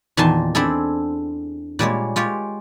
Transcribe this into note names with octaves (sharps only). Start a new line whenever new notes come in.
E2 A#2 D#3 G#5 A5 C6
C4 D4 E4 G#4 A4
A#2 G3 G#3 C#5
G#3 F4 G4 C#5